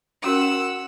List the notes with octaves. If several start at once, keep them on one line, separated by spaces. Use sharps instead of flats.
C#4 F#4 A#4 F#5 E6